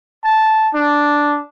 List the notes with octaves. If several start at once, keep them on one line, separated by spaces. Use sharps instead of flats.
A5
D4